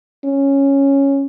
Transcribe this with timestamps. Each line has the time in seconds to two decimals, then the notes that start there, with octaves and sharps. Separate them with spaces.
0.25 C#4